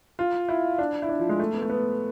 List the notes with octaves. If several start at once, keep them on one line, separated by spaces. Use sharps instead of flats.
F4
E4
D4
E4
D4
F3
G#3
A3
B3
A3
B3